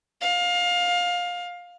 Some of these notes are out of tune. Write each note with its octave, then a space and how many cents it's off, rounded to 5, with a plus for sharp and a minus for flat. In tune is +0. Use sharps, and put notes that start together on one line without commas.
F5 +20